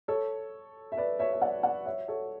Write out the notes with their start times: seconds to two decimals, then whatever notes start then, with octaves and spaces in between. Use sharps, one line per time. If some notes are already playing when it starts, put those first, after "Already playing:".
0.08 A4 C#5
0.92 E5
0.97 B4 D5
1.19 C#5 E5
1.32 E5
1.42 D5 F#5
1.63 D5 F#5
1.86 C#5 E5
2.08 A4 C#5